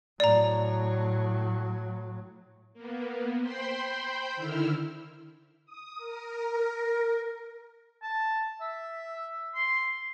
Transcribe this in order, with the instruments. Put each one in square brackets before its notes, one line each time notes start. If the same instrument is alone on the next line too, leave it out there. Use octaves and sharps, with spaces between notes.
[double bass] A2 F#3 [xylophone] D5 A#5
[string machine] A#3 B3
C5 G5 B5 C6 G6
D3 D#3 E4 E6 F6
D#6
A#4
[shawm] A5
E5
C6